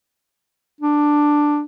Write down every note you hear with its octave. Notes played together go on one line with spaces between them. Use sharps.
D4